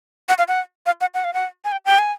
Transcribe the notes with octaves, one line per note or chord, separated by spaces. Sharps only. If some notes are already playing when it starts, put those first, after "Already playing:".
F#5
F5
F#5
F5
F#5
F#5
F5
F#5
G#5
G5
G5
G#5